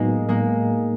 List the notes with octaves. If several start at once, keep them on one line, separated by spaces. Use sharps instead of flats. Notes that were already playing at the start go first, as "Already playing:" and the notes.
Already playing: A2 F#3 G#3 A#3 B3 D#4
G#3 A#3